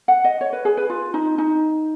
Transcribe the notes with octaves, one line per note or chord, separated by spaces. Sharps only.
F#5
D#5
C#5
B4
G#4
B4
F4
D#4
D#4